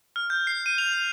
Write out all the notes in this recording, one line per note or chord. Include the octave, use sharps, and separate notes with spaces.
F6
G6
C7
D#7
F7
F7